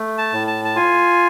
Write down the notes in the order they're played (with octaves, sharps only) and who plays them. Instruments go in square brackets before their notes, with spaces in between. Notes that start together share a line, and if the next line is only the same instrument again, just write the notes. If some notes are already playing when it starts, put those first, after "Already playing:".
Already playing: [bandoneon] A3
A5
A2
A5
A5
F4 G#5